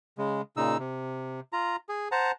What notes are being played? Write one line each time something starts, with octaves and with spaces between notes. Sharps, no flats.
C#3 G#3
A#2 C#3 D#4 E6
C3
F4 A#5
G#4
C5 F#5 A5 A#5